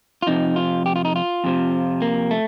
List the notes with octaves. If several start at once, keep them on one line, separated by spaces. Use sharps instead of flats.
F4
F2 C3 F3 D#4
F4
G4
F4
D#4
F4
F2 C3 F3
A#3
A3